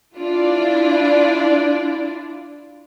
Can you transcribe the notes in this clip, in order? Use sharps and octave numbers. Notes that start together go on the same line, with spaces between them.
D4 E4 F4 D5